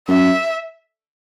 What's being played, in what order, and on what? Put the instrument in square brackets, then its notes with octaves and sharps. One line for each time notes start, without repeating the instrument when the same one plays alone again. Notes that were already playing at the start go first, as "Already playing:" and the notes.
[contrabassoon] F#2 [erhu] E5